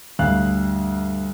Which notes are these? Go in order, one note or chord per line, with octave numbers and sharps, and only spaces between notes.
D2 G2 F5 F#6